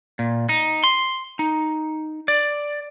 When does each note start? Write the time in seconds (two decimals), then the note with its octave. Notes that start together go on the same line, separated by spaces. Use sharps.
0.19 A#2
0.49 D#4
0.84 C6
1.39 D#4
2.28 D5